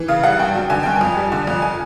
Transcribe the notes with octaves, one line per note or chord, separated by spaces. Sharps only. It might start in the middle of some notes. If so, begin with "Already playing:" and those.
Already playing: E3
C#3 F5
G3 F#5
G2 G5
F#3
D3 G#5
G2 G5
G#5
F2
G3
D3
F2
G#5